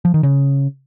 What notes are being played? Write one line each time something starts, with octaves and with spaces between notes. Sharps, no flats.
F3
D#3
C#3